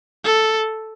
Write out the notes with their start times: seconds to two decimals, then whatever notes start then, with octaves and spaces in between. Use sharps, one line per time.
0.25 A4